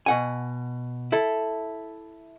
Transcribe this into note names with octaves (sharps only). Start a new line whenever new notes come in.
B2 F#5 G#5
E4 A4